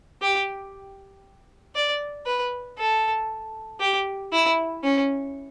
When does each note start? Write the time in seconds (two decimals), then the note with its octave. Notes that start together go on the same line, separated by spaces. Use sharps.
0.22 G4
1.75 D5
2.26 B4
2.78 A4
3.80 G4
4.32 E4
4.84 C#4